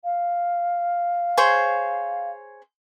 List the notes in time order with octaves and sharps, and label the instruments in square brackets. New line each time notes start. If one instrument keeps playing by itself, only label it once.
[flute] F5
[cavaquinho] G#4 C5 C#5